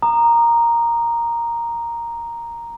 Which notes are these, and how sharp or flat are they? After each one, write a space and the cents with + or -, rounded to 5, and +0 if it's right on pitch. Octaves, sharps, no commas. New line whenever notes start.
A#5 +0 D#6 -35